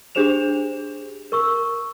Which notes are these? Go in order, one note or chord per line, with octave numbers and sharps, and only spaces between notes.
D4 G4 G#4 C5 E7 F7
A#4 C#6 E6